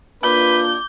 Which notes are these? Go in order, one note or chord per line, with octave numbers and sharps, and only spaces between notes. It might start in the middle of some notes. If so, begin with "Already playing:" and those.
A#3 D4 F4 B4 D6 G6